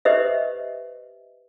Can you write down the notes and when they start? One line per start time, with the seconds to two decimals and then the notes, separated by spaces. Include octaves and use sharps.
0.05 G4 B4 C5 D#5 E5